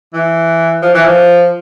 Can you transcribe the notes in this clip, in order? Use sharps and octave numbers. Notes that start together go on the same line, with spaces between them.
E3
F3
E3
F3